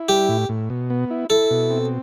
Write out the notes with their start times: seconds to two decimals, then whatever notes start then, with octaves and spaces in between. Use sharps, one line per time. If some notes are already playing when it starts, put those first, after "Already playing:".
Already playing: E4
0.09 G3 G4
0.29 A2
0.49 A2
0.70 B2
0.90 B3
1.10 E4
1.30 E4 A4
1.51 B2
1.71 C4